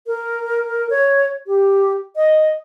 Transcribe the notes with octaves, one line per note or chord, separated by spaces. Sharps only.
A#4
C#5
G4
D#5